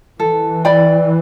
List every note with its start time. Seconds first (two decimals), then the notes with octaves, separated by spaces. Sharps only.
0.19 E3 A4
0.65 D5 G5 B5